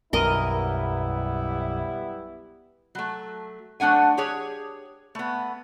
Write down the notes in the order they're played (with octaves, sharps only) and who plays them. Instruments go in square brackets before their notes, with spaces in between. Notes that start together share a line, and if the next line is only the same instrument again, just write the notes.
[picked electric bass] B1 F#2 [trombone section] G3 B3 E4 [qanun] A#4 D#5
[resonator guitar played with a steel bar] F#3 A3
F#3 A3 D4 F#5 G#5
G4 G#4 C#5
A3 B3